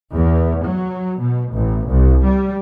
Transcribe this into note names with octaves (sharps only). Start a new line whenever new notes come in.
E2
F#3
B2
A1
C2
G3